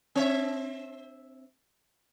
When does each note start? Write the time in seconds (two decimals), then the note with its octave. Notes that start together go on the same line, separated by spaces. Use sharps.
0.15 C4 E5